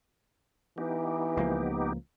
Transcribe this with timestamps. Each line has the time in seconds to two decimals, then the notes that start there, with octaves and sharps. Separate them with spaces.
0.78 E3 B3 D#4 G4
1.37 C#2 F3 A#3